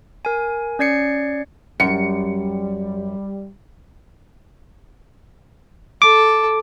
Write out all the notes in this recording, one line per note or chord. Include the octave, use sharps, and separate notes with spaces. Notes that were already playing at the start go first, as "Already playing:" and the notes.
A#4 G#5
C#4 D5 G#6 C7 C#7
F#2 G3 C#7
A4 D6